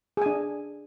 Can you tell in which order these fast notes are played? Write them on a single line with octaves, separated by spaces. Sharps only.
G#4 G#5 D4